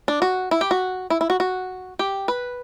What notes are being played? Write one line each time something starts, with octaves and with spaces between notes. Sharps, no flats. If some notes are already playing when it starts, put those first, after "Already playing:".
D4
F#4
E4
G4
F#4
E4
E4
F#4
F#4
G4
B4